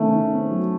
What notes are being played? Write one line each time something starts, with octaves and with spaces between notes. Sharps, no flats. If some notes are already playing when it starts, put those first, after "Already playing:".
Already playing: C3 D#3 A3 C4 C#4
D#3
C4
F#3